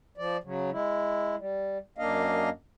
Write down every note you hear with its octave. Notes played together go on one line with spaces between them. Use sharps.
F3 D5
C#3 F#3
G#3 E4
G3
F#2 A#3 D4 D#5 F5